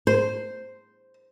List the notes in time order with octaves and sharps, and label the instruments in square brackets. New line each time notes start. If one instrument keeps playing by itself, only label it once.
[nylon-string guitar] C5